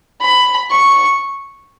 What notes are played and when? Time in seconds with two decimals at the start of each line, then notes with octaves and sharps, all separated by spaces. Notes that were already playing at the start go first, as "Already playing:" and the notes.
0.21 B5
0.71 C#6